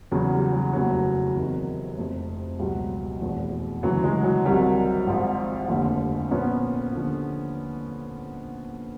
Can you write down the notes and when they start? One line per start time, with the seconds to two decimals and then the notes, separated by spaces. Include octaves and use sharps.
0.11 E2 C#3 F#3
0.32 G3
0.53 F#3
0.73 F1 D#2 C#3 F#3
1.35 E2 C3 D#3 F#3
1.97 F1 F2 C3
2.59 C#2 B2 F#3 G3
3.21 F1 E2 B2
3.83 D2 C#3 E3 F#3
4.04 F#3 G#3
4.24 F#3
4.45 C2 C3 D#3 F#3 G3
5.07 G#1 G#2 F3
5.69 F1 D#2 D3 F3
6.31 A#1 A#2 F3 B3 C#4
6.92 D#2 D3 F3